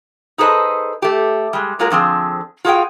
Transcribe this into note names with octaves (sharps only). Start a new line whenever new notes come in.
D#4 G#4 A4 B4 C5 D#5
A3 G4
G3 G#3
F#3 G#3 A#3 F4 G#4 A#4
D3 F3 C4 G#4
F4 F#4 G#4 A#4 F5 G5